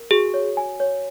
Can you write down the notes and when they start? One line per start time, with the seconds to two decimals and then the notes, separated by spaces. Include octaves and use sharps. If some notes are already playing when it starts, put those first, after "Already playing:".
Already playing: A#4
0.11 F#4 G#4
0.34 C#5
0.57 G#5
0.80 C#5